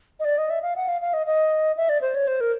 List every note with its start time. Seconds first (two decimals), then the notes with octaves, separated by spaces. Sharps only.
0.20 D#5
0.25 D5
0.38 D#5
0.50 E5
0.62 F5
0.76 F#5
0.88 F5
1.01 F5
1.14 D#5
1.27 D#5
1.77 E5
1.89 D5
2.01 C5
2.15 C#5
2.27 C5
2.41 A#4